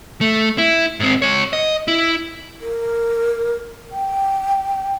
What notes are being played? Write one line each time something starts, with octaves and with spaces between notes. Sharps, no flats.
A3
E4
G#2 C4
G#3 C#5
D#5
E4
A#4
G5